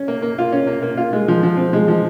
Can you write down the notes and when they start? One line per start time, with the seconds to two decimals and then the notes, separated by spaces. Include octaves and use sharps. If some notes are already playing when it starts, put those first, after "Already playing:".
Already playing: C#4
0.08 A#3
0.22 A#3
0.38 F4
0.53 C#4
0.67 A#3
0.83 A#3
0.97 F4
1.13 G#3
1.28 F3
1.43 F3
1.57 C4
1.73 G#3
1.88 F3